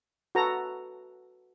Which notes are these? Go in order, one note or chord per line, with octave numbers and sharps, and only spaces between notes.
F#4 A4 B4 A#5